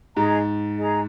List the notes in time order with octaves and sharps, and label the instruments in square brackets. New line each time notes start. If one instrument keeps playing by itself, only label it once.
[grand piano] G#2 [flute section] G#4 D#5 A#5
[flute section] G#4 D#5 A#5